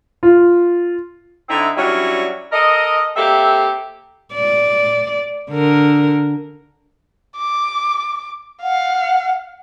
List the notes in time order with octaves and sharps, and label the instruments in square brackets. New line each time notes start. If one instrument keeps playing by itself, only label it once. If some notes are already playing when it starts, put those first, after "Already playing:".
[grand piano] F4
[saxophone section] D3 C4 D#4 E4
F#3 G3 C#4 D4 E4
A4 A#4 D#5
A#3 C4 G4 A4 E5
[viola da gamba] D5
D3 A#4
[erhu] D6
[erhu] F5 [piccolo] F#5